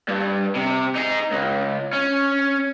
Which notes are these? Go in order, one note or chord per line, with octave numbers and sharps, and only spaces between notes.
G2
C3
D#4 G#4
C#2
C#4